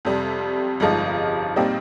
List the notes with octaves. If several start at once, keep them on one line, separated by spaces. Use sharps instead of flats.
F2 C3 G3
G1 G2 F3 G#3 D#4
A#2 G3 C4 D#4